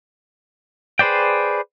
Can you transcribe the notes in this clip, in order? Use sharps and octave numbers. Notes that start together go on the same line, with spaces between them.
G#4 B4 C5 D5 G5